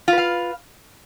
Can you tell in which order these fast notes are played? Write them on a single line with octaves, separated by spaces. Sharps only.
F4 B4 F5